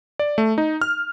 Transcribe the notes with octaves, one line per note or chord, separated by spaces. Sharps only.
D5
A3
D#4
F6